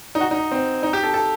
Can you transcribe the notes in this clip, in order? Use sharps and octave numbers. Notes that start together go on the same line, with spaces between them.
D#4
F#4
D#4
C4
D#4
G4
A4
A4